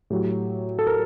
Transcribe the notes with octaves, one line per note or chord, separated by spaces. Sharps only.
A2 F#3 G4
A4
A#4